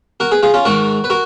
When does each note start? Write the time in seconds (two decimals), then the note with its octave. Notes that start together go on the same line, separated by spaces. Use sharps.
0.20 F#4 A#4
0.31 G#4 B4
0.43 F4 G#4
0.54 C#4 F4
0.65 G#2 D#3 F#4 A#4
1.04 B4
1.10 F#4 A#4